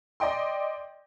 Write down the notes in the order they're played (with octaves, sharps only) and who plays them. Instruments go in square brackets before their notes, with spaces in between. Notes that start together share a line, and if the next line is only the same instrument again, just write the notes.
[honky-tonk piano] D5 D#5 G5 C6